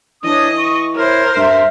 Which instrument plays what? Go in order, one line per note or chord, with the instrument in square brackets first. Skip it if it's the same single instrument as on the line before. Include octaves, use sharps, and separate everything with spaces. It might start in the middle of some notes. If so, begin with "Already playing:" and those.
[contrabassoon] E3 [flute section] D4 C#5 D#6 [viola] D#5
[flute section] C#6
[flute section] E4 C#5 [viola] A#4 C5
[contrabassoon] G2 [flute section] E5